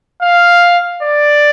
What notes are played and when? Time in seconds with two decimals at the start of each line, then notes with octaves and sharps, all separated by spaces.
0.22 F5
1.03 D5